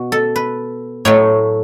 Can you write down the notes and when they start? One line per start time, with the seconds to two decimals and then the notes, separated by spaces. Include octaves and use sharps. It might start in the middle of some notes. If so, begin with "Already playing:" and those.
Already playing: B2 F#4
0.12 A4
0.36 B4
1.05 A2 F#3 A3 C#5